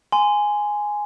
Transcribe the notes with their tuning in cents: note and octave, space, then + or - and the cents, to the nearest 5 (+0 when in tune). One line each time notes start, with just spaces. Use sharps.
G#5 +0 C6 -20